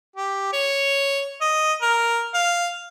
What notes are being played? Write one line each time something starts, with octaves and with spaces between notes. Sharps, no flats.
G4
C#5
D#5
A#4
F5